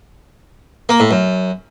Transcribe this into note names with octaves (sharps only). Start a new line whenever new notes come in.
A#3
A2
F#2